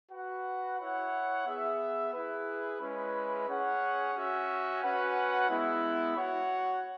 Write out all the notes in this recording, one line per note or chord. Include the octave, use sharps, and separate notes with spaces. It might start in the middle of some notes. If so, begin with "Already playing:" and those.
F#4 B4 F#5
E4 C#5 F#5
B3 G#4 E5
E4 G#4 B4
G#3 C#4 E4 B4
C#4 G#4 C#5 F#5
C#4 F#4 E5
C#4 F#4 B4 F#5
G#3 B3 E4
F#4 C#5 F#5